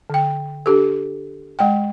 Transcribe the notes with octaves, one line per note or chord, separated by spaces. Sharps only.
D3 G5
D4 G4 A4
G#3 F#5 G5